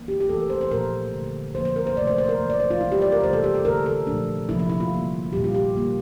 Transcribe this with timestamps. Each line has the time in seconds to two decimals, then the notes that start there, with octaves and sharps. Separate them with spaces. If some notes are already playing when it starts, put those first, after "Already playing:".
Already playing: E3 A#3
0.08 G4
0.21 G4
0.29 C3 E3 A3 A4
0.40 A#4
0.50 C5
0.61 C5
0.71 A#2 F3 A#3 A#4
1.13 D3 A3
1.55 D3 F3 A#3 C5
1.65 C5
1.76 A#4
1.87 C5
1.97 C3 F3 A3 D5
2.07 C5
2.18 C5
2.29 A#4
2.39 E3 A#3
2.50 D5
2.60 C5
2.71 F4
2.81 E3 G3 A#3 E4
2.92 G4
3.02 D5
3.12 A#4
3.23 C3 E3 A3 C5
3.33 A4
3.44 G4
3.54 A4
3.65 D3 A3 A#4
3.86 A4
4.07 A#2 F3 A3 D4
4.49 C3 F3 A#3 E4
4.59 E4
4.70 E4
4.80 F4
4.91 D3 G3 A#3
5.33 A#2 G3 A#3 G4
5.44 F4
5.54 G4
5.75 D3 G3 A#3